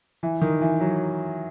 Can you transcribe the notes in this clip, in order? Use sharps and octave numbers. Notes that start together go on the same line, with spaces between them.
E3
D#3
E3
F#3